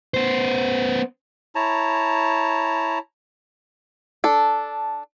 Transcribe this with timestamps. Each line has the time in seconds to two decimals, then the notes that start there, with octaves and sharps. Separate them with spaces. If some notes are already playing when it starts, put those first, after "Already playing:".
0.14 B3 C5
1.55 E4 C#5 A5 A#5
4.24 D4 A4